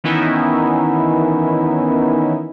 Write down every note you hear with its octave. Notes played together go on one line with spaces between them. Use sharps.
D#3 E3 B3 C#4 D#4 E4